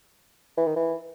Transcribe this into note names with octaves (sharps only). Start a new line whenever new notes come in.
E3
D#3
E3